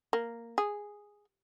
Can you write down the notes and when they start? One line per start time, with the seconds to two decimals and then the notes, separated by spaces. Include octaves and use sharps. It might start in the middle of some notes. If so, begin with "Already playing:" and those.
0.13 A#3
0.58 G#4